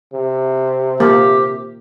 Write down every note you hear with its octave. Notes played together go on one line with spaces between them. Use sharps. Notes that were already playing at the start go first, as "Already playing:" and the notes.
C3
A#3 G4